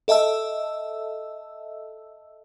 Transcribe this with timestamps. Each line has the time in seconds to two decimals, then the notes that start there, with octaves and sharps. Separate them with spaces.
0.08 A4 D#5 E5 A5 E6